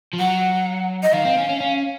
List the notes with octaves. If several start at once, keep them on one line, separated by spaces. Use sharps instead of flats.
F3
F#3 F#5
D#5
D#3 F5
C4
C#4
C#4
C#4